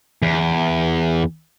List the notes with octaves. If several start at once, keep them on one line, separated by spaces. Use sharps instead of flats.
E2